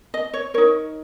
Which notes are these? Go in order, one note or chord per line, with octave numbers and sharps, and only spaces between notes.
D#5
C#5
D#4 A#4 C#5